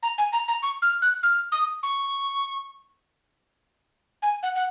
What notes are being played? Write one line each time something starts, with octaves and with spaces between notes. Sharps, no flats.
A#5
G#5
A#5
A#5
C#6
F6
F#6
F6
D#6
C#6
G#5
F#5
F#5